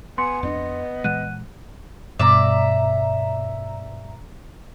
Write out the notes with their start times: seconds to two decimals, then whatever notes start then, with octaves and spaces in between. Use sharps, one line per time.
0.18 B3 G#5 C6 C#7
0.43 F2 C#4 D4 D#5
1.04 A#2 E3 G#3 F#5 F#6 D#7
2.19 G2 B2 D5 E5 A#5